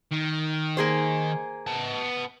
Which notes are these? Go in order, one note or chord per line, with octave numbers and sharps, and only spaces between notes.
D#3
A#3 G#4 C5
B3 A5